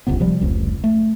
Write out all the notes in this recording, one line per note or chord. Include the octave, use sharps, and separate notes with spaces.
D#1 C#2 C3 B3
C3 F3 G3
F1 C#2
A3